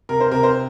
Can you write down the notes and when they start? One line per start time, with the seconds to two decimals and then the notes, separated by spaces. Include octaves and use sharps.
0.09 C3 A#4
0.20 C5
0.31 C3 A#4
0.43 C5